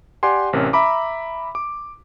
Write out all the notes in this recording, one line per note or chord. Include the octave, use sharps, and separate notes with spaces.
G4 D5 F#5 G#5 C6
A1 C3 C#4 A#4
E5 A#5 B5 D6
D6